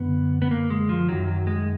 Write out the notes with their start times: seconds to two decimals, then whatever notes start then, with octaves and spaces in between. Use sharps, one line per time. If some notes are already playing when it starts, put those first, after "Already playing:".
Already playing: F#2 D3 B3
0.42 B3
0.51 A#3
0.70 G#3
0.89 F3
1.09 F#2 D#3 F#3
1.28 F#3
1.47 G#3